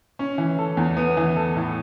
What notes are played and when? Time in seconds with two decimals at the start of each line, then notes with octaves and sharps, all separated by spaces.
0.19 C#4
0.38 E3
0.58 A4
0.77 E2
0.97 B3
1.17 E3
1.36 A4
1.56 A2